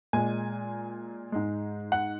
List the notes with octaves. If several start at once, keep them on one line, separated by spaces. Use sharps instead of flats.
A#2 G#3 G#5
G#2 G#3
F#5